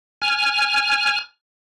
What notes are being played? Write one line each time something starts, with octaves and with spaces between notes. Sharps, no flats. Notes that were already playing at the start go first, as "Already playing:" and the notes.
G#5 F6